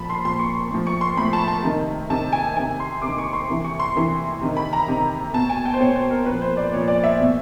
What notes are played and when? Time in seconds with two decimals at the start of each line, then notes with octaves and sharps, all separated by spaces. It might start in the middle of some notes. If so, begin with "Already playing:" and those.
Already playing: A#2 F3 A5 B5
0.10 C6
0.25 A#2 F3 C6
0.39 C#6
0.70 A2 F3
0.87 C#6
1.01 C6
1.17 A2 F3 B5
1.33 A5
1.48 A5
1.63 C3 D#3
2.10 C3 D#3 A5
2.33 G#5
2.56 C3 D#3 G#5
2.80 C6
3.02 C3 D6
3.07 D#3
3.18 C#6
3.33 C6
3.49 C3 E3
3.65 C#6
3.79 C6
3.95 C3 E3
4.41 C3 D#3
4.57 B5
4.73 A#5
4.88 C3 D#3
5.34 B2 A5
5.50 G#5
5.65 G5
5.74 C5
5.80 B2 C#5
5.96 C5
6.11 A#4
6.26 A#2 F3 B4
6.42 C5
6.57 D5
6.73 A#2 F3 C#5
6.88 D5
7.04 E5
7.20 B2